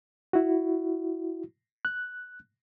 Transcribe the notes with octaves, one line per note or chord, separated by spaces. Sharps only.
E4 F#4
F#6